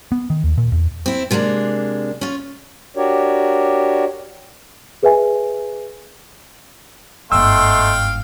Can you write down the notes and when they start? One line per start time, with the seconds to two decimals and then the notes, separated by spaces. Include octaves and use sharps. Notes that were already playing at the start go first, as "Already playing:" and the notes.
0.12 B3
0.30 D#3
0.44 D#2
0.58 A#2
0.72 E2
1.06 C4 E4
1.31 C3 G#3 A#3 C#4 D4
2.21 C#4 F4
2.97 D4 F#4 G4 A#4 C#5 D5
5.03 G#4 B4 D#5 E5 G#5
7.32 G1 G#2 A3 D#5 F5 G5 C6 E6